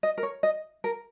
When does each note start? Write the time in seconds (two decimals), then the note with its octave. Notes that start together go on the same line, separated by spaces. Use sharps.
0.03 D#5
0.18 A#4
0.23 C#5
0.43 D#5
0.84 A#4